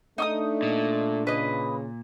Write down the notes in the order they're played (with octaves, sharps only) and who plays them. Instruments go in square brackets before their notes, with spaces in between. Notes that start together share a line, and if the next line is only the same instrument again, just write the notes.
[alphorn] A3 [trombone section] D4 [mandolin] D#4 D6 D#6
[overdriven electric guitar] A#2
[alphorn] C#3 [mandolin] B4 D#5